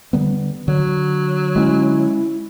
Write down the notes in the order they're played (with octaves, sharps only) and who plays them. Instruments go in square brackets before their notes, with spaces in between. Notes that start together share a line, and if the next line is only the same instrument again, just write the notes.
[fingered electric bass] D3 G3 B3
[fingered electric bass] D3 [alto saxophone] F#3
[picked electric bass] G#3 B3 C#4 [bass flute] E4